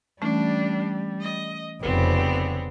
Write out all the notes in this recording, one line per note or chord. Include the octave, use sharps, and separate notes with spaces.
E3 G3 A3 C#4 D4
D#5
F1 C#3 G3 B3 C4